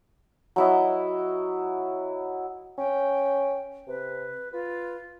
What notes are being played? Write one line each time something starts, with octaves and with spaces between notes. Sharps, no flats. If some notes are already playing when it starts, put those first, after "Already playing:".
F#3 E4 D#5
C#4 G5
C3 B4
F4 B4